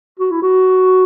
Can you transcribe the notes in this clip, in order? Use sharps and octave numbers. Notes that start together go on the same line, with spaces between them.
F#4
E4
F#4